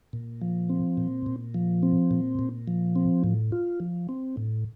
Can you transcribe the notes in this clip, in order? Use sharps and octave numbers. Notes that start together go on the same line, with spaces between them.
A#2
F3
C4
A#2
A#2
F3
C4
A#2
A#2
F3
C4
A2
F4
F3
C4
A2